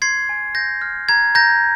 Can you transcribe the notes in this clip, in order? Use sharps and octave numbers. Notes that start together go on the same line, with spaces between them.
C6 G#6 C7
G#5
G6 A#6
F6
A#5 G#6
A#5 G6 A#6